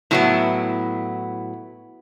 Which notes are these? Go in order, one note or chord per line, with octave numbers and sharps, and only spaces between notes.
A2 F#3 B3 E4